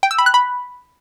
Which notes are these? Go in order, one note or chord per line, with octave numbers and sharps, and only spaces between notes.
G5
E6
B5
F#6
B5